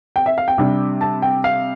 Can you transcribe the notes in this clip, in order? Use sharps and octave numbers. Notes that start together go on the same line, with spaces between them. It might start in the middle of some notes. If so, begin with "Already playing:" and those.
G5
E5
F5
G5
C3 G3 D4
A5
G5
F5